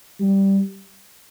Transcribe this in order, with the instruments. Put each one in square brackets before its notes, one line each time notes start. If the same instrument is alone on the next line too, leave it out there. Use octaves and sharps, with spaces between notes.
[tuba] G3